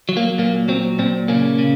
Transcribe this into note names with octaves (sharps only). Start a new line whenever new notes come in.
F#3
A#3
A#2 A#3
F#3 C4
A#2 C4
C#3 A#3 C#4
C#3